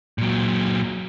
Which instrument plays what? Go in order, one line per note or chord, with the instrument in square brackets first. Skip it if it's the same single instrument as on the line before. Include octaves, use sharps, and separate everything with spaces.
[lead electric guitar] A#2 F#3